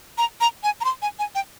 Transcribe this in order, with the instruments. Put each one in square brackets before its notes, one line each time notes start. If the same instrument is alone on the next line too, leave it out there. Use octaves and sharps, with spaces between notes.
[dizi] A#5
A#5
G#5
A#5
C6
G#5
G#5
G5